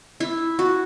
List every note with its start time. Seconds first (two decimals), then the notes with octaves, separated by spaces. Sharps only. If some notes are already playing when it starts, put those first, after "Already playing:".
0.20 E4
0.59 F#4